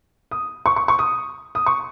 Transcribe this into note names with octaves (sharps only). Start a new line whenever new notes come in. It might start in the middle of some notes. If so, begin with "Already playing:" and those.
D#6
C#6
C#6
C#6
D#6
D#6
C#6